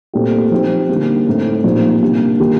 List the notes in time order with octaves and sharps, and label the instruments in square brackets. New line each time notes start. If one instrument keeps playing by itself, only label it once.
[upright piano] A#2 A3 C4 G4
F3 C4 D#4 G4
D3 G3 A#3
A2 A3 C4 D#4
A#2 F3 C4 D#4 G4
C3 G3 A#3 D4
D#3 G3 A#3 F4